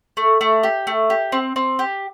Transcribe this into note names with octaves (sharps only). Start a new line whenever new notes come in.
A3
A3
G4
A3
G4
C4
C4
G4